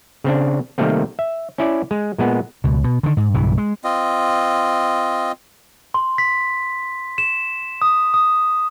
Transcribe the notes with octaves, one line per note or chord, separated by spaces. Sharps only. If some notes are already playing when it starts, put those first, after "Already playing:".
C#3 C4 D4
C3 D#3 G3 A3 A#3 C4
E5
C#4 E4 D5
G#3
A#2 G#3 B3
C#2 B2
B2
D3 D#3
G#2
B1 G2 C#3 E3
G#3
C4 F4 D#5
C6
B6
E7
D#6
D#6